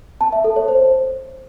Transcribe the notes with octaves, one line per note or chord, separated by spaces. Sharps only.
A5
E5
A4
C#5
C5